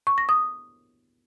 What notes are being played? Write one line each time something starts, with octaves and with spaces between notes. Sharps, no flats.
C#6
A#6
D#6